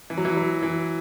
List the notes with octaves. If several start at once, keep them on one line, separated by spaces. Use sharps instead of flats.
E3
F#3
E3
F#3
E3